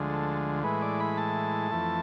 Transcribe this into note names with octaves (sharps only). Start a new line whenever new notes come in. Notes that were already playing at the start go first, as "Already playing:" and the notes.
Already playing: D2 D3 F3 G#3
A4
A2 E3 G#3 B4
D5
B5
A5
F2 E3 A3